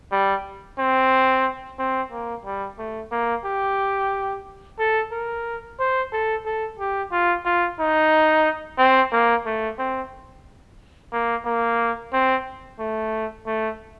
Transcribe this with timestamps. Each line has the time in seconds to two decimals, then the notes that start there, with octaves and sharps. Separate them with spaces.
0.11 G3
0.79 C4
1.79 C4
2.12 A#3
2.45 G3
2.79 A3
3.11 A#3
3.45 G4
4.79 A4
5.12 A#4
5.79 C5
6.12 A4
6.45 A4
6.79 G4
7.12 F4
7.45 F4
7.79 D#4
8.78 C4
9.12 A#3
9.46 A3
9.78 C4
11.13 A#3
11.45 A#3
12.13 C4
12.80 A3
13.46 A3